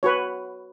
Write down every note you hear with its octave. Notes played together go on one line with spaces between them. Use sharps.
F#4 B4 C#5